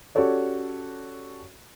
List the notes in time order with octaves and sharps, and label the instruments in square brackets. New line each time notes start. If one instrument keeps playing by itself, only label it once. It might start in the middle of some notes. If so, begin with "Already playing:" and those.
[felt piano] C#4 F#4 G4 A4 C#5 D5